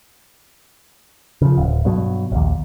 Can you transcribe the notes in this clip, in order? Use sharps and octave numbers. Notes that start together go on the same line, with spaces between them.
C#3 F3
D1
G2 B2 F#3
A#1 D#2